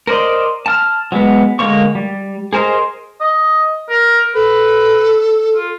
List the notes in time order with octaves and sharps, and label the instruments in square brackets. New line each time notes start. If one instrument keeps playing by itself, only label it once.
[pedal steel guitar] A#4 C5 D5 D#5
A5 F6
F#3 G#3 B3
D3 G#3 A#3 C#5 C#6
G3
G#4 A#4 C5 D#5
[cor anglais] D#5
A#4
[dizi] A4 [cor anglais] B4
[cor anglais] F4